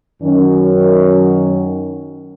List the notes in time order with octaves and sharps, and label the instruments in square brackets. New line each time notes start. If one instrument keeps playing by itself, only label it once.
[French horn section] F#2 D#3 F#3 C#4